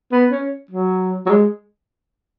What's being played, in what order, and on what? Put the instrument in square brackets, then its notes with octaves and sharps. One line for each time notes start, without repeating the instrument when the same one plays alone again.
[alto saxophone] B3
C#4
F#3
F#3
G#3